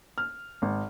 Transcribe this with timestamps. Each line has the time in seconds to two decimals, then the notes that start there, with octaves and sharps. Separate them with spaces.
0.18 F6
0.62 G#1